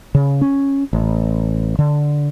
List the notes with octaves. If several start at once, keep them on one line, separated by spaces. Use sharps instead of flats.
C#3
C#4
A1
D3